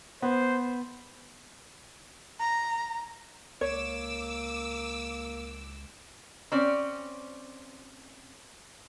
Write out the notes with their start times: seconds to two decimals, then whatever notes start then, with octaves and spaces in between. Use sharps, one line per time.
0.22 B3 C5
2.39 A#5
3.61 C#2 A#3 C#5 D6 E6
6.52 C4 C#4 D5